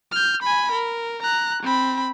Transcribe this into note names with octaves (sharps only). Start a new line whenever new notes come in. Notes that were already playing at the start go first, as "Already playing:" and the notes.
F6 G6
G#5 B5
A#4
A#5 F#6
C4 B5